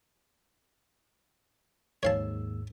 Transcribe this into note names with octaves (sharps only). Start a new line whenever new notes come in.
D#2 G#2 C#5 F5 A5 E6